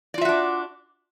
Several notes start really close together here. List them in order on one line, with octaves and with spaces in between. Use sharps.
D5 F4 E5 F#4 D4